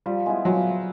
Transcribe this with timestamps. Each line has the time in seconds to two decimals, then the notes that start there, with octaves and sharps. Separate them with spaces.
0.06 F3 G3
0.26 G#3 B3 E4
0.45 F3 F#3